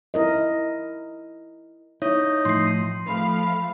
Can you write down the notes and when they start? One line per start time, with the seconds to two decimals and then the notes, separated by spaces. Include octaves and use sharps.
0.14 E4 A#4 D#5
2.02 D#4 E4 C#5
2.45 A2 F3 C6 C7
3.08 F3 A3 F5 B5